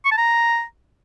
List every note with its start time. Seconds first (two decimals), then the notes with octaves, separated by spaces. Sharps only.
0.05 C#6
0.11 A5
0.18 A#5